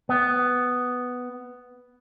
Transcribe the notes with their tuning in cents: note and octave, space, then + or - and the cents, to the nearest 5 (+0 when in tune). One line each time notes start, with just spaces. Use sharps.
B3 +5